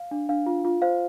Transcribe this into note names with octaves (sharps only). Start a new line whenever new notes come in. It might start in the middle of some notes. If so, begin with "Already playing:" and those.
Already playing: F5
D4
D4 F5
F4
F4
C5 F5